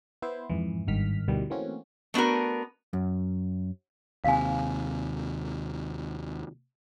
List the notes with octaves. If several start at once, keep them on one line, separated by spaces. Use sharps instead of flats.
B3 E4 C5
F2 G#2 E3
G#1 G2 D#3 F6 B6
D2 G2 B2 D#3 E3 G3
E3 A3 A#3 C4 C#4 F#4
A3 B3 D4 F#4 A#4
F#2
D#2 C3 F5 G#5